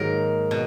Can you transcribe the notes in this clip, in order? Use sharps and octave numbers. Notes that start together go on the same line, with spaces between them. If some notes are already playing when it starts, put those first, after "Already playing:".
Already playing: G#2 D#3 F#3 A#3 A#4
B2